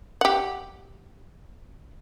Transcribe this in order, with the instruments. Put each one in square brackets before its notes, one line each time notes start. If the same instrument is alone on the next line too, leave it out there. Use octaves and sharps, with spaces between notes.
[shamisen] G4 F#5